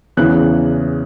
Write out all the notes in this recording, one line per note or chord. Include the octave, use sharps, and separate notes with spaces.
E2 C#3 E3 F#6